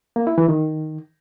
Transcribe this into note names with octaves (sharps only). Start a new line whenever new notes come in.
A#3
E4
E3
D#3